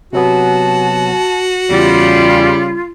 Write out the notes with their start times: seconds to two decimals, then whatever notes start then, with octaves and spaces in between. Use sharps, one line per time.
0.13 C3 F#3 B3 F#4 A5
1.70 E2 C#3 G3 F4 A6